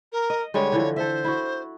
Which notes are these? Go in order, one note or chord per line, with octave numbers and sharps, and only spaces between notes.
A#4
D#5
D3 G3 G#3 C#5
D3 E3 F3
A4 C5 E5
E4 F#4